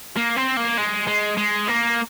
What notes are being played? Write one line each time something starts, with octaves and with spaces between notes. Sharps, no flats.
A#3
C4
A#3
G#3
G#3
G#3
A#3